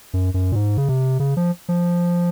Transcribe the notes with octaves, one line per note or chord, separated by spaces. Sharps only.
F#2
F#2
A#2
G#2
C#3
C3
C#3
F3
F3